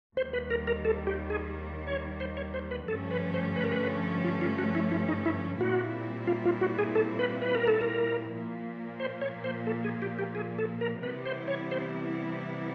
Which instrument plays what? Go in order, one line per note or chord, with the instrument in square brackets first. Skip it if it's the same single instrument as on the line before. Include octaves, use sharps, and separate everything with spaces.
[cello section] D#2 D#3 G3 [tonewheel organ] C5
[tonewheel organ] B4
A#4
A#4
A4
G4
G#4
C#5
C5
C#5
C5
B4
[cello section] G2 D3 F3 A3 C#4 [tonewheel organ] A4
[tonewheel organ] B4
C5
B4
A#4
B4
F4
F4
F#4
E4
E4
D#4
E4
[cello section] A#2 G3 C4 E4 [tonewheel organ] F#4
[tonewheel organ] F4
F4
F#4
G#4
A4
B4
B4
A#4
A4
A#4
[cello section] A#2 F3 A#3
[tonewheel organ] C5
C#5
C5
A4
G#4
G4
G4
G#4
A4
A#4
[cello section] C3 E3 G3 B3 E4 [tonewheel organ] B4
[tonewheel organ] C5
C#5
C5